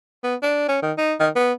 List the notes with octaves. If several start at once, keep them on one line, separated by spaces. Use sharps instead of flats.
B3
D4
C#4
D#3
D#4
D#3
B3